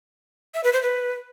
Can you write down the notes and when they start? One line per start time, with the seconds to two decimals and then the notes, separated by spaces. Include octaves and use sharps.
0.54 E5
0.64 B4
0.73 C5
0.82 B4